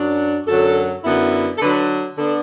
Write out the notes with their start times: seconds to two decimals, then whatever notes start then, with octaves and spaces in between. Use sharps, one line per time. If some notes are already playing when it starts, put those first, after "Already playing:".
Already playing: F#2 F#3 D4
0.46 F#2 D3 F#3 A4
1.04 F#2 D3 B3 E4
1.56 A4
1.60 D3 F#3 D4 B4
2.17 D3 B3 D4 A4